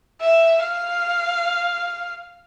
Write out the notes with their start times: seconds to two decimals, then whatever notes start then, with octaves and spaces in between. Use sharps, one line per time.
0.21 E5
0.63 F5